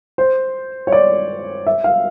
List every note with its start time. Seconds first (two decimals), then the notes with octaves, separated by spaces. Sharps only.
0.18 C5
0.87 C#5
0.92 D5
1.67 E5
1.84 F5